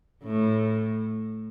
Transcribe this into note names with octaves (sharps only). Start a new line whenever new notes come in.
A2